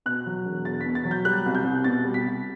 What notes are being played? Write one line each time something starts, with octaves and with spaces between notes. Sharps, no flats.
B2 F#6
F#3
E1
E2 A6
B6
B2
A6
F#3
G6
G3 F#6
C2
G6
C2
B2 A6
G3
B6
C2